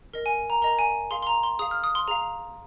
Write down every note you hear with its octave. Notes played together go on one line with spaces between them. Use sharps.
A#4 D#5
G#5
A#5
A#4 D#5 A#5
G#5
G#4 F5 C6
C6
A#5
C6
G#4 F5 D#6
F6
D#6
C6
G#4 F5 A#5